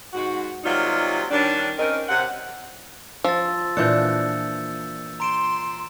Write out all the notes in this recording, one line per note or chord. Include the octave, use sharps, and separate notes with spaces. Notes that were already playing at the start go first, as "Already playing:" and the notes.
G#2 F#4
C3 F#3 G3 A#3 D#4 F4
D#3 G3 C#4 D4
C4 C#4 D#4 A#4
C3 F#5
F3 E6 A6
A#2 E3 D4 E6 G6 C#7
A#5 C6 D7 E7